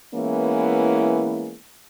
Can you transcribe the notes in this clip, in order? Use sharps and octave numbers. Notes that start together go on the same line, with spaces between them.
E3 G#3 A#3 B3 C#4 E4